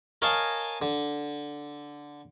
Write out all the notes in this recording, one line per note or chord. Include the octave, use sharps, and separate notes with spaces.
A#4 C#5 D#5 F5 G#5 A5
D3